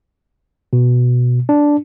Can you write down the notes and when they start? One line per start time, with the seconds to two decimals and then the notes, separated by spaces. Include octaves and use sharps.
0.73 B2
1.49 D4